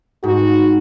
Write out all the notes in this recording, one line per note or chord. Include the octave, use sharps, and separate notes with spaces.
G#2 F#4